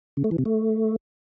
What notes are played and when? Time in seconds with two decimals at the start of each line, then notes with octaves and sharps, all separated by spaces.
0.17 C#3
0.24 A3
0.31 E3
0.38 C3
0.45 A3